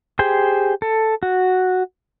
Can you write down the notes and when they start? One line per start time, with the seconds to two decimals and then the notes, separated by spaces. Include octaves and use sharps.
0.19 G4 G#4 C5 G5
0.82 A4
1.23 F#4